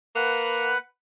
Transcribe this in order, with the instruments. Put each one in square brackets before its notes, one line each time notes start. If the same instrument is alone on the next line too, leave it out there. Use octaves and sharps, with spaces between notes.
[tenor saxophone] A#3 [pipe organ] B4 F#5